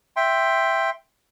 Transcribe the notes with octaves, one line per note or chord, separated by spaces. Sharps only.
E5 G5 C6